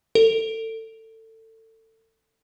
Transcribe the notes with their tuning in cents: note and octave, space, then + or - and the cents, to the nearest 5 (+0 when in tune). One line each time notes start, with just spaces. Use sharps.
A4 +25